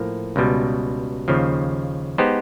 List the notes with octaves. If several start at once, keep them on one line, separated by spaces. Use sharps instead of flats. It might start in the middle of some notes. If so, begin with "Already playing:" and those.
Already playing: A2 F3 A#3
C#2 B2 G3
D#2 C#3 F3
G#3 B3 D#4 G4 C5